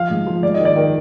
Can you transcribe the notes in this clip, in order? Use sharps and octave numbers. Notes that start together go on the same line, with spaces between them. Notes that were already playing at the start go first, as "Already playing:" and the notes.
Already playing: F3 F5
G#2
F3
G#2 D5
D#5
D#3
D5
D#3